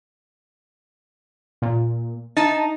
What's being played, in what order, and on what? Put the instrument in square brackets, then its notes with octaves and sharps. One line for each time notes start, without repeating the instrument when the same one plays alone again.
[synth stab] A#2
[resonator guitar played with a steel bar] D#4 [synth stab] A5